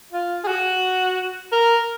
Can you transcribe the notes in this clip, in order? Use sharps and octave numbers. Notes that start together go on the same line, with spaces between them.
F4
G#4
F#4
A#4